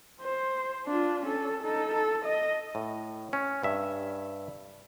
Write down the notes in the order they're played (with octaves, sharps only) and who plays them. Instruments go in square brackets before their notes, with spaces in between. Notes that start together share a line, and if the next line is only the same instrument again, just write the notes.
[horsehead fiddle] C5
D4 F4
C#4 A4
D#4 A4
A4
D#5
[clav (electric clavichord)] A2
C#4
G2 E5